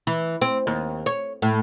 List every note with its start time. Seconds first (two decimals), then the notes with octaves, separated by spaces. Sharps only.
0.07 E3
0.42 C4
0.67 D#2
1.06 C#5
1.42 A2